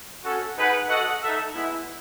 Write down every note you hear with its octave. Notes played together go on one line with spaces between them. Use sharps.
C#4 F#4 A4
D#4 G#4 B4 F#5
F#4 A4 D#5 F#5
D#4 A4 E5
G#3 B3 E4